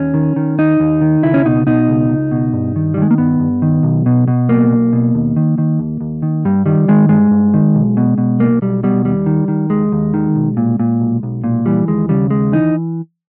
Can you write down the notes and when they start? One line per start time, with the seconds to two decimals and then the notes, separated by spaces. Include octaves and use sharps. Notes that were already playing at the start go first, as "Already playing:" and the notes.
Already playing: D#2 C#4
0.14 D#3
0.36 D#3
0.58 D#2 D#4
0.80 D#2
1.01 D#3
1.23 C#2 E4
1.34 C#4
1.45 B2 D#4
1.67 B2 D#4
1.88 C#2
2.09 C#2
2.31 B2
2.53 G2
2.76 D#3
2.94 G3
2.97 D#3 G#3
3.11 A#3
3.18 G2 B3
3.40 G2
3.62 D#3
3.83 B1
4.06 B2
4.28 B2
4.49 B1 A#3
4.71 B1
4.93 B2
5.15 D#2
5.37 D#3
5.58 D#3
5.79 D#2
6.01 D#2
6.22 D#3
6.45 G2 G3
6.66 D#3 G3
6.88 D#3 G#3
7.09 G2 G#3
7.31 G2
7.54 D#3
7.75 B1
7.97 B2
8.18 B2
8.39 B1 A#3
8.62 B1 G3
8.83 B2 G3
9.05 D#2 G3
9.26 D#3
9.48 D#3
9.70 D#2 G#3
9.92 D#2
10.14 D#3
10.35 B1
10.57 A#2
10.79 A#2
11.00 B1
11.23 B1
11.44 A#2
11.66 E3 G3
11.88 D#2 G#3
12.09 C#3 G3
12.31 D#2 G#3
12.52 E3 D#4